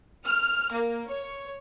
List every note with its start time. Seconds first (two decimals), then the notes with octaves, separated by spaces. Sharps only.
0.24 F6
0.73 A#3
1.09 C#5